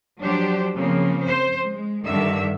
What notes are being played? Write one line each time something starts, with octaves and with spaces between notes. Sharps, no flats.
F3 F#3 D4 G4 C5
C#3 F3 A#3 C4
C5
G#3
G2 D3 D#3 E5